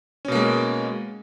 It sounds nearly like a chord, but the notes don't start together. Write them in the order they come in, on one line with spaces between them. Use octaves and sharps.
C#4 B2 A#3 G#3